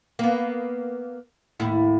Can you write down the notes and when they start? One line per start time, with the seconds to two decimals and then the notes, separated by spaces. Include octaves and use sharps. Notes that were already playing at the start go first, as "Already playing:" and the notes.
0.19 A#3 B3
1.60 D#2 A2 E4